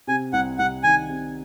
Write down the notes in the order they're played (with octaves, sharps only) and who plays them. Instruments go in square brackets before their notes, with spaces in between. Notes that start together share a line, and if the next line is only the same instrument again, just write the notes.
[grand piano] C3 [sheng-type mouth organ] G#5
[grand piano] C2 [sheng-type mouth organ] F#5
[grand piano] C2 [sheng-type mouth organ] F#5
[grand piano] D#3 [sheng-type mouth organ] G#5
[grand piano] C3